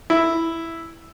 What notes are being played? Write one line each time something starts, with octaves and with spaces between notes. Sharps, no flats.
E4